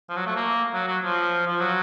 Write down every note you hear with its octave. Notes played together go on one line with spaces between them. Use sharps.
F3
F#3
A3
A#3
F#3
F#3
F3
F3
F#3